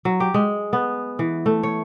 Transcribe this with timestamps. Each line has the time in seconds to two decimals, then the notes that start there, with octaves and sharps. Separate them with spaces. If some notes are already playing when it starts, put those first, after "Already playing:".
0.05 F#3
0.20 G4
0.34 G#3
0.73 B3
1.19 E3
1.46 A3
1.63 C#5